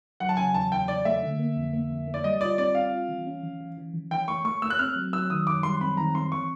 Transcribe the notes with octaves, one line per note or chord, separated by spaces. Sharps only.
F#3 F#5
A5
C#3 G#5
E2 A5
E2 G5
E2 D5
A3 E5
D3
A#3
F2
A#3
F2
A#3
D5
G3 D#5
F4 D5
C4 D5
C4 F5
F4
E3
C#4
E3
E3
E3
E3
E3 G5
A3 C#6
A3 C#6
A3 E6
F#6
C4 F6
F#3
F#3 E6
D#3 D#6
F#2 D6
G3 C6
C4 B5
D#3 A#5
C4 C6
E3 C#6